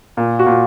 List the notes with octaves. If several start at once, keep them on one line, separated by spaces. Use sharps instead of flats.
A#2
F#4
A#2